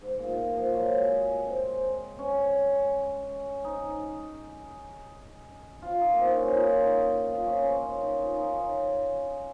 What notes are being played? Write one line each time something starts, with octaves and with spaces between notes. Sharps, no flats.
G#2
A#2
F3
F#3
G#3
G#3
C4
C#4
D#4
F4
D#4
A#3
C4
C#4
F4
D#4
F4
C#4
C#4
D#4
D#4
F4
D#4
C#4